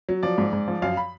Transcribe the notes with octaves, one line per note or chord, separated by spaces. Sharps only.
F#3
F3 D5
G#2
G#2
F3
F#2 F5
B5